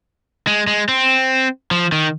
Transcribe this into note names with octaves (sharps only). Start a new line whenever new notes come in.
G#3
G#3
C4
F3
D#3